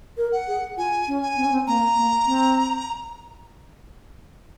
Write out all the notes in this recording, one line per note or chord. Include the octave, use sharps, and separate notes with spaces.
A#4
F#5
G#4
F4 G#5
C#4
G#5
C4
C#4
C4
A#3 A#5
A#3
C4